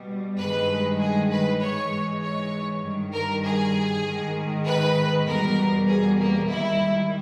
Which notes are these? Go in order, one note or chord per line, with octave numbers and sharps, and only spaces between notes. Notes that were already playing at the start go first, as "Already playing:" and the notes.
Already playing: B2 G3
G2 D#3 G#3 B4
G#4
B4
G#2 E3 G#3 C#5
C#5
G2 D#3 G3
A#4
G#4
G#2 D#3 G#3
B4
E2 B2 G3 A#4
G#4
A#3
G#2 D#3 G3 E4